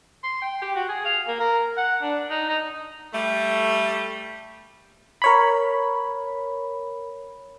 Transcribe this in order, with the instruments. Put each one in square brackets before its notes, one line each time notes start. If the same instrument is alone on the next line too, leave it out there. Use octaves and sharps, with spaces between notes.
[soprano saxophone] C6
G5
G4
F#4
G#4
F5
A#3
A#4
F#5
D4
D#4
D#4
[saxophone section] G3 A3
[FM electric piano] A#4 C#5 B5